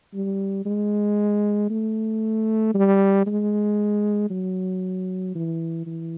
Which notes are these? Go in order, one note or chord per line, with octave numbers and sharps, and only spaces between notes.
G3
G#3
A3
G3
G#3
F#3
E3
E3